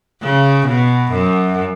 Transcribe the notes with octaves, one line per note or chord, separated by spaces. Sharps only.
C#3
B2
F#2